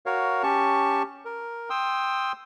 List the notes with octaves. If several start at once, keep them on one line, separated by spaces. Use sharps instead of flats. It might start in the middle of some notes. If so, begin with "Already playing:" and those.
F#4 A#4 C#5 F5
C#4 G4 A5 C#6
A#4
G5 C6 D#6 E6